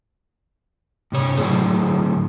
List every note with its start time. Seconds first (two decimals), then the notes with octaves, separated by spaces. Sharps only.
1.12 G2 C3 C#5
1.37 A2 D3 F#3 A#3 G#4 C5